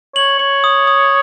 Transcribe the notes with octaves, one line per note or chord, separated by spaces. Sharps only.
C#5 F#7
C#5 F#7
D#6
D#6